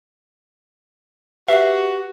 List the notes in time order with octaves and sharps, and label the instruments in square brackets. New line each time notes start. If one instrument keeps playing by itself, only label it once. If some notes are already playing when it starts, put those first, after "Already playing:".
[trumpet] F#4 [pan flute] G4 [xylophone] B4 C7 [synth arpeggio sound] E5